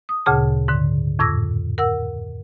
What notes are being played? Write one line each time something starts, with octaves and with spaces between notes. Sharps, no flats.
D#6
D2 A#2 C#3 G#4 A5
G#2 D3
F2 A2 D6 E6 G#6 A#6
A#4 F#5 E6